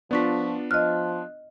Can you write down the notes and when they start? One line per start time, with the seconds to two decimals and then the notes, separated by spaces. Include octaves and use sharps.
0.11 F3 B3 D4 F4 D5 C#6 B6
0.71 F3 D#5 F6 F#6